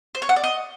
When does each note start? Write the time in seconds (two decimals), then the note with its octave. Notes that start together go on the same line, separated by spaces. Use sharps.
0.15 C5
0.22 C#5
0.29 F#5
0.36 D5
0.44 D#5